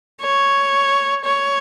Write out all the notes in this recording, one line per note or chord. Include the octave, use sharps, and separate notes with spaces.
C#5
C#5